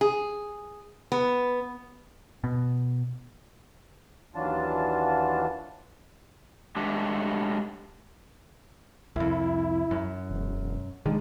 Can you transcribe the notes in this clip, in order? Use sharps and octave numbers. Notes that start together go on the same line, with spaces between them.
G#4
B3
B2
D#2 E3 F#3 D4 F4 A5
F#3 G#3 A3 D4 G4
C2 F2 E4
F#2
E1
A#1 D3 D#3 G#3